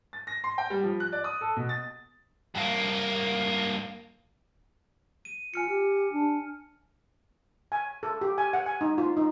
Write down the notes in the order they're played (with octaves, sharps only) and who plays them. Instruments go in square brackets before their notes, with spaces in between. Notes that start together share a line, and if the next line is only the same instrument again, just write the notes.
[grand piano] A6
A#6
C6
G5
G3
F3
F#6
D5
D#6
A4
B2
A6
[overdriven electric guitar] G2 A#3
[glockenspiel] D#7
[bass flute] F4 [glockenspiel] G#5 F6 C#7
[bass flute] G4
D4
[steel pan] G#5
A4
G4
G#5
F#5
G#5
D#4
F4
D#4